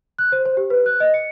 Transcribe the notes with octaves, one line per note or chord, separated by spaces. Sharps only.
F#6
C5
C5
G4
B4
F#6
D#5
C#7